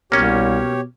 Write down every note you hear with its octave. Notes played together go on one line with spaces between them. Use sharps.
C2 B2 A#3 C#4 G4 C#5